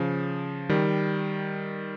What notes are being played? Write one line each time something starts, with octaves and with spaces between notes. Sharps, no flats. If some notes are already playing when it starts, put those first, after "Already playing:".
Already playing: C#3 F3
D#3 G3